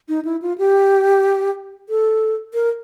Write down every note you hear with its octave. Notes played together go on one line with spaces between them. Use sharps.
D#4
E4
F4
G4
A4
A#4